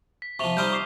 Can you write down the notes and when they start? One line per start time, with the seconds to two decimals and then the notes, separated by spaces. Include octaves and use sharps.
0.22 B6
0.39 C3 F3 C#6 F7 G7
0.57 G3 C4 D#4 D#6 F6 G6
0.72 C#6 D6 C7